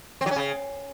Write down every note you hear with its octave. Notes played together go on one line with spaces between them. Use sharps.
C4
F#3
C#4
C#3